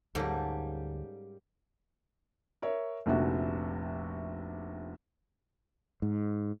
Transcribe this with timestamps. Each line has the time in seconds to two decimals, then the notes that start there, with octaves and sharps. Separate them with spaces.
0.15 D2 G#2 F#3 G3 A#3 C#4 A4
2.62 A#4 C#5 E5
3.06 F1 A#1 C3 F#4
6.02 G#2